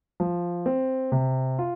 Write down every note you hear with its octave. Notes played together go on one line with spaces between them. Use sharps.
F3
C4
C3
F4